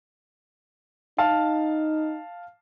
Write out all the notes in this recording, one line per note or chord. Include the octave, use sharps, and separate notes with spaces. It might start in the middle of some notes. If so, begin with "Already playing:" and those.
D#4 F5 A5